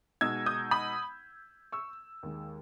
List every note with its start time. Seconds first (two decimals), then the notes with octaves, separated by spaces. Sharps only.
0.21 B2 G#3 D#4 E6 G#6
0.46 D#6 G6
0.71 B5 D#6
1.72 C#6 E6
2.23 D#2 D#3 G#3